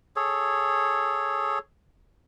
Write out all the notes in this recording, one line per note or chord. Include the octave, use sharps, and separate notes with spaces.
G#4 A4 C#5